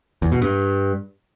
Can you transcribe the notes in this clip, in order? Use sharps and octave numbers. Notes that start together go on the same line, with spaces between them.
E2
B2
G2